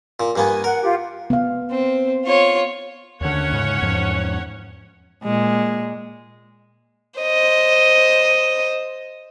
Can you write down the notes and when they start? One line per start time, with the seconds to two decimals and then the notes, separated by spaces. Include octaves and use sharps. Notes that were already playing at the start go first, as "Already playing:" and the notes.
0.20 A#2
0.36 G2 A#3 B3 G#5
0.64 A#4 F#5
0.83 F4 G4
1.30 B3 F5
1.72 C4
2.26 F4 C#5
3.21 D#2 D3 C#4 C#5 F#5
3.52 G#2 C#3
3.82 E2 G#2 F3
5.23 A#2 G#3
7.20 C5 D#5